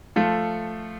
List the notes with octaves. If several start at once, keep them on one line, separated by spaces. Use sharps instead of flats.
F3 A3 F4 A4